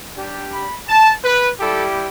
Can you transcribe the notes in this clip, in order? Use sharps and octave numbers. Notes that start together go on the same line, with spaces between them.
G3 D4 G4
B5
A5
B4
G3 E4 G4 A4